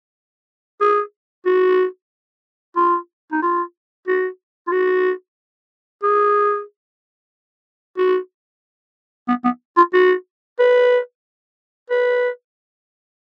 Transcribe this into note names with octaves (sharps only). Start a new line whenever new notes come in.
G#4
F#4
F4
D#4
F4
F#4
F4
F#4
G#4
F#4
B3
B3
F4
F#4
B4
B4